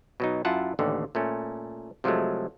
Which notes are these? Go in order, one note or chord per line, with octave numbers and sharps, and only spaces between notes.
B2 F#3 D#4
F#2 E4 F4 F#5 A5
A1 D#2 D3
A#2 A3 C#4
C3 F3 F#3 G#3 A3